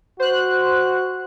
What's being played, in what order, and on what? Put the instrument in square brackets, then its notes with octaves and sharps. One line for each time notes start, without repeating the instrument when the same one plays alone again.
[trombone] F#4 [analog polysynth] C5 F#6